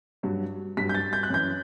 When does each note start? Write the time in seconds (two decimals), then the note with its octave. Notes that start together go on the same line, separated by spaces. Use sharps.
0.23 G2 F#3
0.77 G2 F#3 B6
0.89 G6
0.94 A6
1.13 G6
1.23 F#6
1.30 F#2 E3 G6